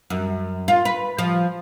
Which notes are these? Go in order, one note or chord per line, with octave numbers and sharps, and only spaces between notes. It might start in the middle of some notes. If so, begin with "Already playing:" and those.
F#2
F4
B4
F3